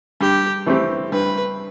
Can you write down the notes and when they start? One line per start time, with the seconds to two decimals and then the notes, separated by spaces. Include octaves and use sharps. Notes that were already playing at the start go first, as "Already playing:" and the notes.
0.21 G2 G4
0.66 E3 A3 C4 G4
1.12 G2 B4